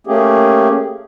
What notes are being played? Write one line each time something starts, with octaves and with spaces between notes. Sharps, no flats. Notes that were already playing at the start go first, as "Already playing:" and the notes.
A3 A#3 C#4 G4 G#4